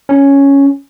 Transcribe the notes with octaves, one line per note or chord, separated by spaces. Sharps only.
C#4